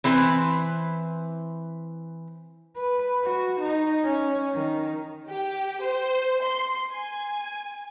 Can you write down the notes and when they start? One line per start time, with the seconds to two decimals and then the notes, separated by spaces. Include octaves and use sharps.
0.04 E3 C4 E4 B4 C5
2.76 B4
3.24 F#4
3.61 D#4
4.04 C#4
4.54 D#3
5.29 G4
5.83 C5
6.43 C6
6.92 G#5